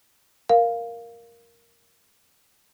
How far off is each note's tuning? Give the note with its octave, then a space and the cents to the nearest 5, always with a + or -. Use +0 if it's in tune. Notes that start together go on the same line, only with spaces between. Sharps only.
A#4 +0 F5 +0